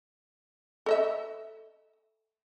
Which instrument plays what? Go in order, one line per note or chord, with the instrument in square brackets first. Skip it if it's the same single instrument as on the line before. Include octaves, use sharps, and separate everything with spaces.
[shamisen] A4 D#5 E5